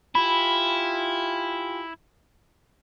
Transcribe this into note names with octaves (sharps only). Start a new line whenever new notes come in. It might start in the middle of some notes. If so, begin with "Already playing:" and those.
E4 F4 G4 G#5 B5